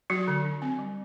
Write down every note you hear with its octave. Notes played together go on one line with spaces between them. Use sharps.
F#3 F#4
D3
D4
C4
G3